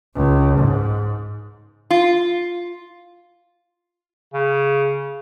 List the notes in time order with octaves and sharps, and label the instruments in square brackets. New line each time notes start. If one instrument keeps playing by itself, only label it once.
[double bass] C#2
G#2
[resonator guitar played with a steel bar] F4
[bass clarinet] C#3